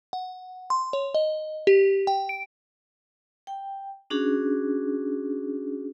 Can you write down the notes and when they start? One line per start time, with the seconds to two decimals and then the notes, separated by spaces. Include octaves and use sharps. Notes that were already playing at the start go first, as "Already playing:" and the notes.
0.13 F#5
0.70 C6
0.93 C#5
1.14 D#5
1.67 G4
2.07 G5
2.29 D7
3.47 G5
4.10 C#4 D4 F#4 G#4